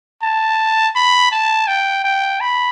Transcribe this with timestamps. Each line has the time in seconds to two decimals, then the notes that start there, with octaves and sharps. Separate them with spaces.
0.23 A5
0.95 B5
1.32 A5
1.68 G5
2.05 G5
2.41 B5